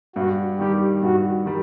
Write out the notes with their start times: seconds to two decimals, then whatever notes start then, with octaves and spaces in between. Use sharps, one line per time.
0.16 G2 F#4
0.59 D#3 G3 G4
1.02 G2 F#4
1.45 D#3 G3